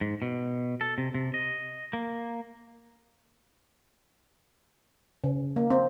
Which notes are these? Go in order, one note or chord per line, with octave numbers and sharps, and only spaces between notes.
G#2
B2
A4
C3
C3
D#5
A#3
C#3
A#3
C4